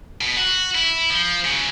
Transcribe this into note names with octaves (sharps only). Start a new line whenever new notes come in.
B2
F#4
E4
F3
C#3 F#3